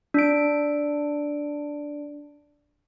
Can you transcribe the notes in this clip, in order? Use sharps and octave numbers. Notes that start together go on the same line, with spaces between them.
D4 D7